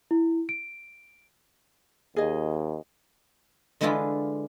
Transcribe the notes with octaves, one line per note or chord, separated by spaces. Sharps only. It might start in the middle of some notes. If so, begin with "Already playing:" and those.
E4
D7
D#2 G#4 D#5
D3 G#3 B3 D4 E4 F4